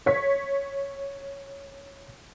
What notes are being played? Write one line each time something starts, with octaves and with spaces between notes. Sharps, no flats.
C#5 B6